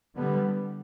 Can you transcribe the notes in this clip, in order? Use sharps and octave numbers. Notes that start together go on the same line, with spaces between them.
D3 G3 B3